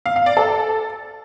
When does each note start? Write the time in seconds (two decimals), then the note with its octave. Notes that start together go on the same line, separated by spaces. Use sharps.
0.06 F5
0.16 F5
0.26 D5
0.37 A4